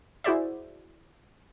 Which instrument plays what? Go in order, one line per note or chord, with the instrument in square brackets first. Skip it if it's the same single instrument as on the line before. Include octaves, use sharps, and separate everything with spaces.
[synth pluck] E4 F#4 G#4 C5 D5 E5